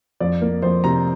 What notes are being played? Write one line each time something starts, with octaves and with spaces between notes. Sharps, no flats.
F2 D5
A#3
F2 C5
C3 A#5